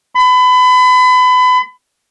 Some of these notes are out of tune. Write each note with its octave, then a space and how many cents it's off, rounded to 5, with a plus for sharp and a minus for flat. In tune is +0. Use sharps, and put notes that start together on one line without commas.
B5 +30